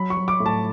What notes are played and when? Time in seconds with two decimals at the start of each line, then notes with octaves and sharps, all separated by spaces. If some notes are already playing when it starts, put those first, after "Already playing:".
Already playing: F#3 B5
0.10 C#6
0.17 F#3
0.28 D6
0.40 A2
0.46 A5